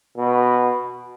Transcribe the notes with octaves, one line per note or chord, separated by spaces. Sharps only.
B2